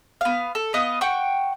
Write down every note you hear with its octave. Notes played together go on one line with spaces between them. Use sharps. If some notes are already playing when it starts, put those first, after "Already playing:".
B3 F5
A4
B3 D#5 F5
F#5 G5 C#6